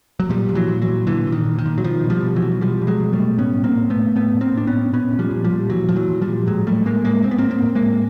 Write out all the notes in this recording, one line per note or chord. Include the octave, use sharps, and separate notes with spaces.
F#3
A#2 F3 G3
A#2
E3 F#3
A#2
E3 F#3
A#2
A#2 D3 E3
A#2
D#3
A#2
D#3
A#2
F#3
B2 D#3 F3
B2
F3 G3
B2
E3 F#3
B2
B2 F3 G3
B2
F#3 G#3
B2
G3 A3
B2
A2 B3 C#4
A2
A#3 C4
A2
A3 B3
A2
A2 A3 B3
A2
A#3 C4
A2 D4
B3 C#4
A2
A#2 B3 C#4
A#2
F3 G3
A#2
F3 G3
A#2
A#2 E3 F#3
A#2 F3
E3 F#3
A#2
F3 G3
A#2
A2 F#3 G#3
A2 G3 A3
A2 G#3 A#3
A2 G#3 A#3
A2 C4
B3
A#3 C4
A2
A#3 C4
A2
G#3 A#3
A2